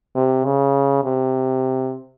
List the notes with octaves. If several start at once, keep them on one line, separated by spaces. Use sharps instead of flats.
C3
C#3
C3